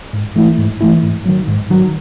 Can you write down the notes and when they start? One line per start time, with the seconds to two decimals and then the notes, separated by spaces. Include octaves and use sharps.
0.13 G#2
0.36 E3 A3 E4
0.58 G#2
0.81 E3 A3 E4
1.03 G#2
1.26 D#3 F#3
1.48 G#2
1.70 D#3 F#3